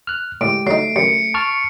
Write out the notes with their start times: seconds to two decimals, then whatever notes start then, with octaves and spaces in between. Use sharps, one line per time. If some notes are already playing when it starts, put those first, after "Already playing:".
0.07 F6 F#6
0.41 A2 G#3 G4 D7
0.67 F#3 A3 D#4 C7
0.96 F#2 C#7
1.34 A5 C#6 F6